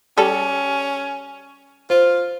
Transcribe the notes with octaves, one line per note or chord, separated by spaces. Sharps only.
G3 C#4 G4 A4
F4 C5